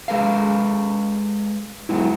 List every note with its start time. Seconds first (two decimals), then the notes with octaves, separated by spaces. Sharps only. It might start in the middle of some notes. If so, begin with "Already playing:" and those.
0.08 G#3 A4 B4 F5
1.89 F#3 G#3 B3 E4